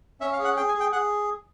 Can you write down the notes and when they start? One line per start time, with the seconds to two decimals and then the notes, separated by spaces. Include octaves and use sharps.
0.21 C#4 E5
0.33 F5
0.39 G#4
0.44 F#5
0.56 G#4 G5
0.69 G#5
0.74 G#4
0.80 G5
0.92 G#4 F#5